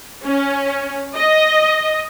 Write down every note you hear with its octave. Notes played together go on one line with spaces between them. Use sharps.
C#4
D#5